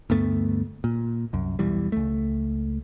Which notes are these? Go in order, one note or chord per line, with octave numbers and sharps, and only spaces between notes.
D2 G2 A3 B3
A#2
C2 F#2
B1 E2 E3 G3
C#2 A3